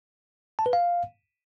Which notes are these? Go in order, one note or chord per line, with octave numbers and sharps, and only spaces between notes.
A5
B4
F5